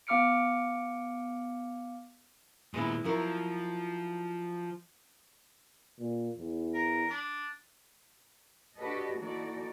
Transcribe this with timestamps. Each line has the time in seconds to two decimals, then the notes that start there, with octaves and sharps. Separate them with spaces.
0.07 B3 F5 D6 F6 C#7 D7
2.74 A#2 D#3 G#3 B3 E4
3.05 F3 F#3 E4 A#4
5.99 A#2
6.37 E2
6.74 A#4
7.10 D4
8.78 D4 F#4 G4 A4 B4 D#5
9.21 E3 A#3 D#4 F#4 A4 D5